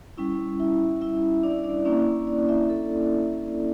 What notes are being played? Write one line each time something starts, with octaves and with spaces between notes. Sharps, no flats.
G3 C#4 E4
E4 E5
E4 E5
D4 D5
D4 D5
A#3 C#4 D4 E4 D5
D4 D5
E4 E5
A4